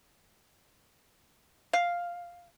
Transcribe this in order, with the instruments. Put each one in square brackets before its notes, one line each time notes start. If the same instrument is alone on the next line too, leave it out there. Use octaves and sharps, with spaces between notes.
[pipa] F5